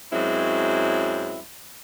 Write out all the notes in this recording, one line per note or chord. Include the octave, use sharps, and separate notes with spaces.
F#2 F#3 G#3 C4 E4